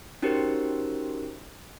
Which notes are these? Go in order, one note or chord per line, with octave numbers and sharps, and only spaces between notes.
C#4 D#4 F#4 G4 A#4 C5